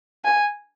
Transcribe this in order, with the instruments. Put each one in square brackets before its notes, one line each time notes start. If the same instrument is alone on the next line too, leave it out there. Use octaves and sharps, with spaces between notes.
[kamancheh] G#5